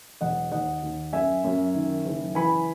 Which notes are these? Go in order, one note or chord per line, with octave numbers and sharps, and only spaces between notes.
E1 D#5 F#5
D#2 D#5 F#5
D#2
F#2 E5 G#5
F#2
D#3
F#1
E3 G#5 B5